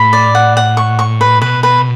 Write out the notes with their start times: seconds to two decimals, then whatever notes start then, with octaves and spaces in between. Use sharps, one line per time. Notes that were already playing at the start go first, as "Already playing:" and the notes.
Already playing: A2 B5
0.13 D5
0.35 F#5
0.57 F#5
0.77 C#6
0.99 C#6
1.21 B4
1.41 B2 B4
1.63 B4